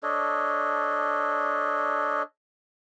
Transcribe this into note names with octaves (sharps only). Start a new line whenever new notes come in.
D4 A4 C#5 D#5